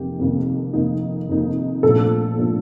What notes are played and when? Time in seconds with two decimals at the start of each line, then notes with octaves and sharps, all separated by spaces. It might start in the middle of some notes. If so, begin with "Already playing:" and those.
Already playing: F1 F2 D#3 A#3 D#4 G4
0.19 F1 F2 D#3 A#3 D#4
0.73 F1 F2 D#3 A#3 D#4
1.29 F1 F2 D#3 A#3 D#4
1.83 A#1 A#2 F3 A3 D4 A4
2.38 A#2 F3 A3 D4